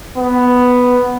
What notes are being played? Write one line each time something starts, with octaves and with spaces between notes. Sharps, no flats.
B3